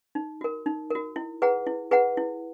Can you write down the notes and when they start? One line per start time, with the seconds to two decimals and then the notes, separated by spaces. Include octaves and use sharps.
0.15 D#4
0.41 F#4 A#4
0.66 D#4
0.91 F#4 A#4
1.16 E4
1.42 G#4 B4 F#5 A#5
1.67 E4
1.91 G#4 B4 F#5 A#5
2.17 E4